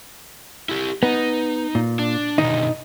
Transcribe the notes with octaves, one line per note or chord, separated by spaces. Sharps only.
E4 G4
B3 D#4
A#2
D4
B2 D3 D#3 D#4